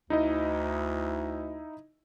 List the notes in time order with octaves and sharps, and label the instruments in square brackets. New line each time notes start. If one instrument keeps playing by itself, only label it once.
[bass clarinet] D2 [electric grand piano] D#4 E4 D#5